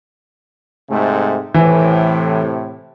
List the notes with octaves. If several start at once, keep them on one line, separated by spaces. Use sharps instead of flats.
G#2 C3 A3
A2 C3 E3